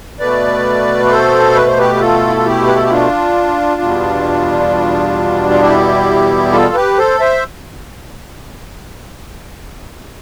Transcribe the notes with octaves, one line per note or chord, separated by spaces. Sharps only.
B2 A3 B4 D5
D5
A4 C5
B4
C5
G4 B4
B4
F4 A4
E4
F4
E4 G4
B4
A4
G4
D4 F4
E2 B2 G3
F4
E4 G4
F4 A4
G4 B4
A4 C5
C5 E5